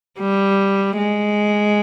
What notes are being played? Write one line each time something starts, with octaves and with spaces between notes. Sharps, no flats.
G3
G#3